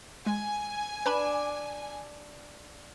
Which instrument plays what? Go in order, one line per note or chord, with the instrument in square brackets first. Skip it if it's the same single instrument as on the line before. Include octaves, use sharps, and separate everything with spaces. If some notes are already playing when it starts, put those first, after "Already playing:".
[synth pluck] G#3 [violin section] G#5
[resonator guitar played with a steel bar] D4 [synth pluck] B4 A5 B5